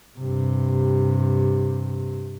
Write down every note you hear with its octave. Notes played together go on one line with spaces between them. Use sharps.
G2 C3